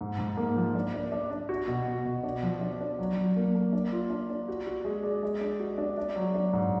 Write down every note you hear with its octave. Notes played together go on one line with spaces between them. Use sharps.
G#2
G#2
A#3
F3
D4
D4
D4
D4
F#4
B2
B2
B2
D4
F3
D4
D4
F#3
F#3
A#3
A#3
D4
F4
D4
D4
F#4
F#4
G#3
D5
G#3
D4
F#4
D4
D4
F#3
D4
G#2